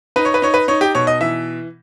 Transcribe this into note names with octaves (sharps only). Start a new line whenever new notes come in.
D#4 B4
C#5
B4
D#4 C#5
B4
D#4 C#5
G4
B2 C#5
D#5
E3 E5